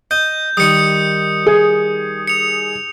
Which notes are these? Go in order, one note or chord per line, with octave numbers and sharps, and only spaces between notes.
D#5 G6
D#3 G3 D#6 C#7
G#4
C#7 F7